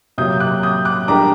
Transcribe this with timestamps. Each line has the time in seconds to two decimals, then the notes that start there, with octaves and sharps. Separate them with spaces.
0.18 C3 F#3 A#3 D#6 G6
0.40 D6 F#6
0.63 D#6 G6
0.85 D6 F#6
1.08 G3 D4 G4 A#4 A#5 D6